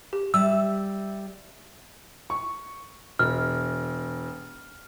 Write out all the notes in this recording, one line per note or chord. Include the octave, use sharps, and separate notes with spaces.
G4
G3 E5 E6
C#6
E1 F6